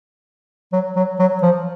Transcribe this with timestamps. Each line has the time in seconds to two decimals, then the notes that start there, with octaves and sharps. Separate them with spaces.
0.73 F#3
0.96 F#3
1.19 F#3
1.42 F3